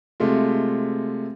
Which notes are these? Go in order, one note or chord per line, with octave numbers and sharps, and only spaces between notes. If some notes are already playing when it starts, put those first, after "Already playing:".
C3 G#3 A3 F4